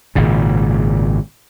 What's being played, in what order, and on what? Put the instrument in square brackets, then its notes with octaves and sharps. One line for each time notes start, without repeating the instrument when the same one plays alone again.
[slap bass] G#1 A#2 C#3